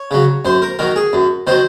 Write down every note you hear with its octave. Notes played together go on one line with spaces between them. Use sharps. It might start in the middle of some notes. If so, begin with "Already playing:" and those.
Already playing: C#5
C#3 F#3
F#2 C5
A#4
D#3 F#3 A#4
G#4
F#2
D#3 F#3 C5